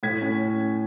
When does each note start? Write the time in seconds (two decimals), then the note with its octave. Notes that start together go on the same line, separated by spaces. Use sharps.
0.03 A2 G#6 B6
0.22 C#4